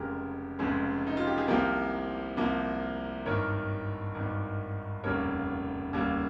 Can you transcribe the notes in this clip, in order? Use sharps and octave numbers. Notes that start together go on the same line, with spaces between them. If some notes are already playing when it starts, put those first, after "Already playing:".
Already playing: F1 F2 C#3 G#3 G4 A#4
F1 F2 C#3 G#3
D#4
F4
G4
G#4
C2 C3 F3 A#3 G4 A#4
C2 C3 F3 A#3
G#1 G2 D#3 A#4 C#5
G#1 G2 D#3
F1 D#2 C#3 G3 A#3 A#4 C#5
F1 D#2 C#3 G3 A#3